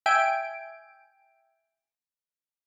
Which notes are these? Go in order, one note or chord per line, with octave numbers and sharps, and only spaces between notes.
E5 G5 G#5 D7